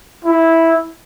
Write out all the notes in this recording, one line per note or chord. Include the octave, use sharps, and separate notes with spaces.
E4